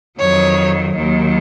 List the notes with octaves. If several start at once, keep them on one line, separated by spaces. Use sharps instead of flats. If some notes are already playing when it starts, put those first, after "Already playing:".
F2 D#3 F#3 C#5
D#2 D#3 F#3